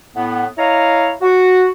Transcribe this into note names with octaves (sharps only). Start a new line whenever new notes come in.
A2 B3
E4 C#5 D#5 F5 A#5
F#4